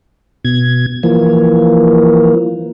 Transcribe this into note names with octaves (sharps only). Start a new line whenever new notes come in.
B2 G#6
E3 F3 A#3